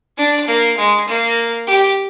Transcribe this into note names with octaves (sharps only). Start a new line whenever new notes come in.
D4
A#3
G#3
A#3
G4